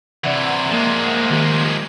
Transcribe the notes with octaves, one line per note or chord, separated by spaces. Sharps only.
C3 E3 D5 E5 F#5
F3 G#3 A#3
D#3 G4 C7